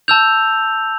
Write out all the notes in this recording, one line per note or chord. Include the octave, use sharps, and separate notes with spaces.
A5 E6 G6 F7